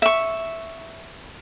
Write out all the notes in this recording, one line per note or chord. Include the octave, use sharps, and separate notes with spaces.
E5 C#6